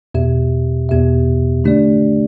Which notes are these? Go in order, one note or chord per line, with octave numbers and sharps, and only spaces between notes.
E2 B2 B3 G4 E5
E2 B2 B3 G4 E5
D3 A3 D4 G4 D5